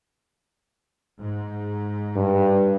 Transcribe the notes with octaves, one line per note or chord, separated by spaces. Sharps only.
G#2
G2